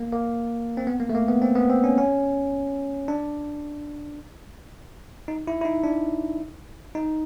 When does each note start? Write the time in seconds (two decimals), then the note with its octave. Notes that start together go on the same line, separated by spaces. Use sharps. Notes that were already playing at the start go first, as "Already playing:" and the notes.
Already playing: A#3
0.12 A#3
0.77 C4
0.87 B3
1.00 A#3
1.09 A3
1.15 A#3
1.28 B3
1.42 C4
1.55 B3
1.70 C4
1.84 C#4
1.98 C#4
3.08 D4
5.28 D#4
5.47 E4
5.62 E4
5.65 D#4
5.84 D4
6.95 D#4